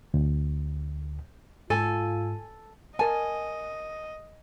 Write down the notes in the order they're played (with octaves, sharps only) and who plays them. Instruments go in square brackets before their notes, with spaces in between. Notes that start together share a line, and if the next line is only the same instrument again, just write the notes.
[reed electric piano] D2
[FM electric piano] G#2 [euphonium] F4 [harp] A4 [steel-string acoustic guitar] G#5
[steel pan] A#4 A5 [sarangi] D#5 [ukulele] G#5